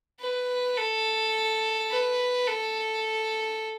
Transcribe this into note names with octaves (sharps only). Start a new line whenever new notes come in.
B4
A4
B4
A4